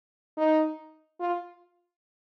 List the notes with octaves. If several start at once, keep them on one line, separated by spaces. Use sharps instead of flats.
D#4
F4